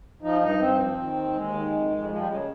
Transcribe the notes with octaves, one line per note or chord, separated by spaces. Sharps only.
F3 D#4
G2 D#4
G2 C4
F3
D#3
D#2
D#2 G#3
D#3
F2
F2
F3 G#3
G3
C#3 G#3
A#3